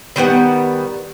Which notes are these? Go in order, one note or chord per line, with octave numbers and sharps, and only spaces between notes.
D#3 G3 B3 F#5